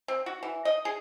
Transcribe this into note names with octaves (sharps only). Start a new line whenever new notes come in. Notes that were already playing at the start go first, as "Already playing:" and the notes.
C4
F#4
E3
D#5
G#4